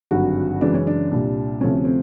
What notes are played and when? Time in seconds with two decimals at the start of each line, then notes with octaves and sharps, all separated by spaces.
0.11 G#1 G2 D3 F#3 F#4
0.61 F#2 C#3 E3 G#3 D4
0.74 C#4
0.87 D4
1.11 C2 A#2 G3
1.60 D2 C3 F3 A3 C#4
1.85 C4